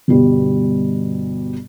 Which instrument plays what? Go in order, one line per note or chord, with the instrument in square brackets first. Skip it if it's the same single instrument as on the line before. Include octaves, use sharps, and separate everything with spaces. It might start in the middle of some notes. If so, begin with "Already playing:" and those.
[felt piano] G1 B2 G3